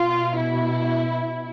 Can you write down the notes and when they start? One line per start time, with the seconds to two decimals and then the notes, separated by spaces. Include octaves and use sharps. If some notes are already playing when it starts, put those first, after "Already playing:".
Already playing: B2 F4
0.38 E4